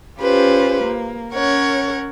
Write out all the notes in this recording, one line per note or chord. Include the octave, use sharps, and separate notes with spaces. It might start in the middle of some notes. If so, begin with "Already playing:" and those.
C#4 F4 G4 B4 C5
A#3
C#4 A#4 C#5 F#5